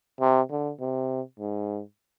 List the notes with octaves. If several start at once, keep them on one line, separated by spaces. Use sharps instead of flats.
C3
D3
C3
G#2